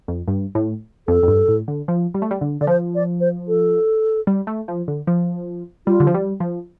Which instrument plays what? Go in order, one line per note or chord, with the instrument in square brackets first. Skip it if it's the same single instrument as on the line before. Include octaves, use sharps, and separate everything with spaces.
[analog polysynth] F2
G2
A2
[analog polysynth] F2 [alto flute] A4
[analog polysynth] F2
G2
A2
D3
F3
G3
A3
G3
D3
[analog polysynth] D3 [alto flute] D5
[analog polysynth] F3 [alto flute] C5
[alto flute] D5
C5
A4
[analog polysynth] G3
A3
F3
D3
F3
[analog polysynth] G3 [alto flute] F4
[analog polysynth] D3
F3
G3
F3